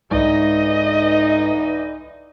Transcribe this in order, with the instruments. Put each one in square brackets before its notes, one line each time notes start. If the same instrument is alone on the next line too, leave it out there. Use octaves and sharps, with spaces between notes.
[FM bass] C2 [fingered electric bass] G#2 [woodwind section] D3 E3 D#4 [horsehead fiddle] D#5